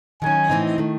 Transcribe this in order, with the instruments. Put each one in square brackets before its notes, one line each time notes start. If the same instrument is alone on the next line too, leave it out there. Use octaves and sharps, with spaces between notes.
[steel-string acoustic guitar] D#3 F#3 C#4 [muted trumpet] G#5
[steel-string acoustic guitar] A2 E3 C4 D#4
D#3 A3